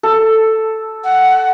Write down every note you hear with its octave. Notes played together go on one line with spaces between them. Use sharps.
A4
F#5